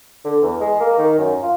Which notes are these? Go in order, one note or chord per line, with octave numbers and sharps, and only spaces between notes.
D3
E2
G#3
A#3
D#3
F#2
F4